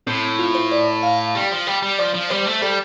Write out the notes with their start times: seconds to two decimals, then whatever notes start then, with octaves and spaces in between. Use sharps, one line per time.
0.07 A2 C4
0.39 F4
0.55 C5
0.71 D5
1.03 F5
1.35 G3
1.51 F3
1.67 G3
1.82 G3
1.99 F3 D5
2.14 F3
2.30 G3 C5
2.47 A3
2.62 G3 A4